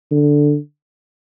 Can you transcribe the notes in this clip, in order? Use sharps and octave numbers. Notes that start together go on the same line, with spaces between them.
D3